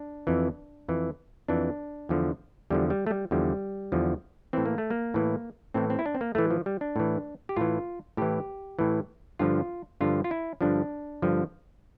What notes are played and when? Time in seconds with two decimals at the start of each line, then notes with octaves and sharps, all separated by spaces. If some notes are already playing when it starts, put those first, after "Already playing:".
Already playing: D4
0.27 F2 E3
0.88 F2 E3
1.48 F2 E3 D4
2.09 E2 D3 F3
2.70 E2 D3 F3 G3
2.90 G3
3.07 A3
3.11 G3
3.31 E2 D3 F3 G3
3.92 E2 D3 F3
4.53 A2 E3 C4
4.66 A#3
4.78 A3
4.90 A#3
5.14 A2 E3
5.74 A2 E3 C4
5.90 C4
5.99 E4
6.06 D4
6.15 C4
6.21 A#3
6.35 A2 E3 A3
6.50 F3
6.66 G3
6.81 D4
6.96 A2 E3
7.49 G4
7.56 A2 E3 F4
8.17 A2 E3 G4
8.79 A2 E3
9.39 G2 D3 F3 F4
10.01 G2 D3 F3 F4
10.24 F4
10.31 E4
10.61 G2 D3 F3 D4
11.22 G2 D3 F3